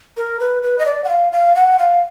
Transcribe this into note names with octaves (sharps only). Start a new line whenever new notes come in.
A#4
B4
B4
D#5
D5
F#5
F5
F5
F#5
F5